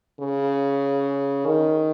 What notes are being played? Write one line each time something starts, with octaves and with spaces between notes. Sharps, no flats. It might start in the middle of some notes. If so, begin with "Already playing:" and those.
C#3
D#3